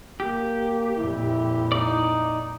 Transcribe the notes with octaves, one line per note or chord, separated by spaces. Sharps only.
A#3 G4
F2 A#2 E4
D#4 D5